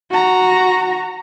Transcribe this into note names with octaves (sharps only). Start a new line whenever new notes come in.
F#4 A#5